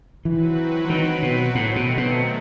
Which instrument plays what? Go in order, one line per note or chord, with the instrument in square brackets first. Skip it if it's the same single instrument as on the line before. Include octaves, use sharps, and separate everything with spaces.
[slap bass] E3 [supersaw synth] F#3 C4 F#4 B4
[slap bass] D#3
B2
[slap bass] A2 [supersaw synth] D#3 F#3 A3 C4
[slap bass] B2
B2